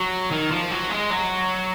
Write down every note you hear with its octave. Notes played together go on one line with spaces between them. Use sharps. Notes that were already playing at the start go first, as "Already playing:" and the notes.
Already playing: F#3
D#3
F3
F#3
G#3
F#3